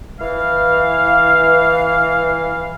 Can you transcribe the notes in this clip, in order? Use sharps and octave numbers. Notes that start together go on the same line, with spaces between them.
E3 F5